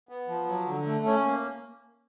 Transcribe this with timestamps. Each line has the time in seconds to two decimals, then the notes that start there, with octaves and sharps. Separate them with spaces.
0.09 B3
0.28 F3
0.47 F#3
0.67 D3
0.86 A3
1.06 C#4
1.25 A#3